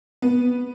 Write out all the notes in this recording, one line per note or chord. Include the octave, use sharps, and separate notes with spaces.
B3